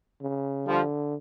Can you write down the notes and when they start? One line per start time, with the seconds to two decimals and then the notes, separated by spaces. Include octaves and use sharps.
0.21 C#3
0.66 D3 F3 G3